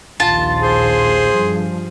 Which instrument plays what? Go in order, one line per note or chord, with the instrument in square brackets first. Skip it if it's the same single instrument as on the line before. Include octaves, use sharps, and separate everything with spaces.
[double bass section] A#1 D#2 [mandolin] F4 A5
[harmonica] G#4 C5
[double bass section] G2 F3